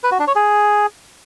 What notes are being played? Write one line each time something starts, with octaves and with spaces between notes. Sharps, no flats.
B4
F#4
D4
C#5
G#4